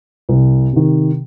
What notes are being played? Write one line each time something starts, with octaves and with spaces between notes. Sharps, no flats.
C2
C3 D#3